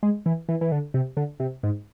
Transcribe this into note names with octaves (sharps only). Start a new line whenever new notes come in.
G#3
E3
E3
E3
D3
C3
D3
C3
G#2